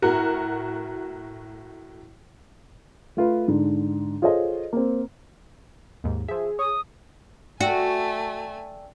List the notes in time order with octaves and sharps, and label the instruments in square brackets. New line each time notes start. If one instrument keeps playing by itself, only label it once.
[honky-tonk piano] A2 F#4 A#4
[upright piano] A3 F4 B4
G#2 D3
F4 G#4 A4 C5 C#5 D#5
A#3 C4
[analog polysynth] D#2 G#2
[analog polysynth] F3 E5 [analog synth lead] G#4
[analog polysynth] C#5 [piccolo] D#6
[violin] A3 G#5 [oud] F#4 [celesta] D5 G5 E6